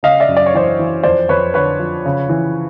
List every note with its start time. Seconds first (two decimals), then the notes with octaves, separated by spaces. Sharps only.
0.03 C#3 D#5 F5
0.20 D5 E5
0.28 F#2
0.37 D5
0.46 C#5
0.54 E3 C5 D5
0.79 E3
1.03 F2 C5 D5
1.29 F2 B4 C#5
1.54 D3 B4 C#5
1.79 F3
2.05 C#3
2.29 E3